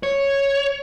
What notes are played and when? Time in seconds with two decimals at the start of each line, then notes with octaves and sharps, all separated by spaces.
0.03 C#5